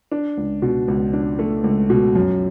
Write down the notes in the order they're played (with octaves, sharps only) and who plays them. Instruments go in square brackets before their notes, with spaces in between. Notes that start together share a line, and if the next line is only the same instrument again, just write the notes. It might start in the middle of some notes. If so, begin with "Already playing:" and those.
[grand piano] D4
C#2
B2
C#2
D4
A3
C#2
B2
F#2